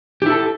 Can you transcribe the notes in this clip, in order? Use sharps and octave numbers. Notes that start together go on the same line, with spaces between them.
E4 G4 A4